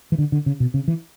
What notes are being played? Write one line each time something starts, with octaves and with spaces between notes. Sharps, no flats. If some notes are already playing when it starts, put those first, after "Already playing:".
E3
D3
D3
C#3
B2
C#3
E3